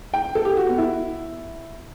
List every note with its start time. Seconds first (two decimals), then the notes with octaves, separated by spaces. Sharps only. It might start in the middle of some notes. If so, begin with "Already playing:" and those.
0.14 G5
0.35 A4
0.45 G4
0.57 F#4
0.67 B3
0.78 E4